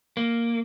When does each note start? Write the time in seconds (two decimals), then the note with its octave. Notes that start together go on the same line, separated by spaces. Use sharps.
0.17 A#3